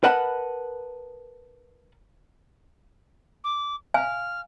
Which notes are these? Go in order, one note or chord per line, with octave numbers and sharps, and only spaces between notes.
A#4 B4 D#5 F#5 A5 B5
D6
F5 G#5 F6